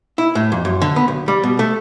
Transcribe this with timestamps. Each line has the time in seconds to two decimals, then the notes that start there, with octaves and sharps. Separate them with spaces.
0.18 E4
0.35 A2
0.52 F2
0.65 F#2
0.82 D3
0.96 B3
1.08 B1
1.28 G3
1.44 B2
1.59 A3